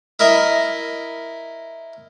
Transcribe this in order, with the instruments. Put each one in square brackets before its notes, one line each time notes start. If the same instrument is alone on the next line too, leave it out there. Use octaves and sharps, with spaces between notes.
[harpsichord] E4 A#4 D#5 E5